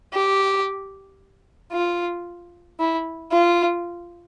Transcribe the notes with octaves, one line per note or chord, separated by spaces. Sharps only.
G4
F4
E4
F4